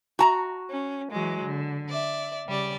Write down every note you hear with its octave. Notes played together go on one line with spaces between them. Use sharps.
F#4 A5 A#5
C#4
E3 F#3 G#3
D3
D5 E5
C#3 G3 D5